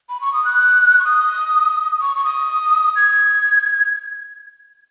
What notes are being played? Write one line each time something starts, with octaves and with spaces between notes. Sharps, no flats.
B5
C#6
D#6
F#6
C#6
D#6
C#6
C#6
D#6
G#6